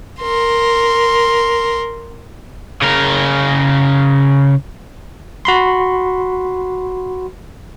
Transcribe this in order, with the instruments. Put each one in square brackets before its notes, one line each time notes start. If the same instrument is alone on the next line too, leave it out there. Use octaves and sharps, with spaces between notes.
[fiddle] A#4 C6
[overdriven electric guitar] C#3 A#4
[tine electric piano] F#4 B5 C6